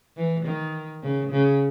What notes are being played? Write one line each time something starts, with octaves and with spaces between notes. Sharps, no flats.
E3
D#3
C#3
C#3